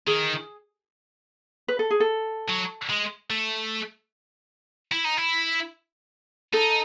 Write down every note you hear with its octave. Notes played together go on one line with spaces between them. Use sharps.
D#3 G#4
B4
A4
G#4
A4
F#3
G#3
A3
E4
D#4
E4
D#4 A4